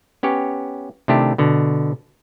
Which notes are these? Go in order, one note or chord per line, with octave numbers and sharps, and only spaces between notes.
B3 C#4 G4 C#5
C3 D#3 A3 D4 E4 G4
B2 D3